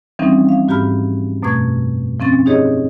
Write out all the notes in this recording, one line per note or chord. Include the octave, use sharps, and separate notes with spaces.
E3 F3 G3 C4 C#4 D#4
F5
G#2 F#4 G4 A#5 B5 F6
F#2 B2 A3 C#6 G#6
F3 C4 C#4 A6
D#4 G4 G#4 C#5 D#5